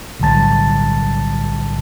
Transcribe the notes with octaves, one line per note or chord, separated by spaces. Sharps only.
B1 A2 D3 G3 A5 A6